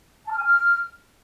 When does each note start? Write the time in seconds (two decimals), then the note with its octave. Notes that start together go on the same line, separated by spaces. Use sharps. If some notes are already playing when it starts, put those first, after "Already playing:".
0.26 A5
0.32 F6
0.38 G#5
0.44 F6